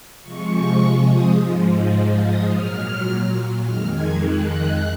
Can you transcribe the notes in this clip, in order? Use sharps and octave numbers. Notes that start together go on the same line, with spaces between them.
C3 F3 G#3 C#6
D#6
G#2 F3 G#3
D#6
A#2 F#3 F6
F2 D#3 G#3 F6
G#6
F#6
F#6